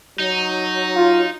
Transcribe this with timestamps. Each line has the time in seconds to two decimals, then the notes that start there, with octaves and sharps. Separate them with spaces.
0.19 F#3 D#4
0.96 F4